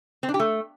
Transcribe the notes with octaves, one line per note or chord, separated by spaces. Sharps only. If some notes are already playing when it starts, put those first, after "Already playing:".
C4
D4
G4
A3